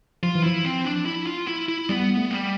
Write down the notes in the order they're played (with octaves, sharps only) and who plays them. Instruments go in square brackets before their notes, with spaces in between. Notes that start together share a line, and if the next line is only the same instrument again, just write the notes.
[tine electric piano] F3 [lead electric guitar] F4
[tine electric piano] E3
[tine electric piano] F3 [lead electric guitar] E4
[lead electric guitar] C4
D4
E4
F4
E4
E4
[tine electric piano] G3 [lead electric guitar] B3
[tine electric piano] A3
[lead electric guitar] G3